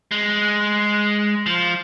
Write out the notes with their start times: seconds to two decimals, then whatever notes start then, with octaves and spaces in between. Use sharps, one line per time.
0.11 G#3
1.46 F3